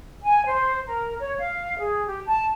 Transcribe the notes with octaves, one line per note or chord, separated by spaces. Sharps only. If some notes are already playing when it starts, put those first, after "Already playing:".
G#5
C5
A#4
C#5
F5
G#4
G4
A5